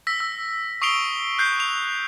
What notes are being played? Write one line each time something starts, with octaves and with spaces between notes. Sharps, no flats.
E6 A#6 B6
E6
C#6 D#6 C7 D7 F7 G7
F#6 G6 C7
F7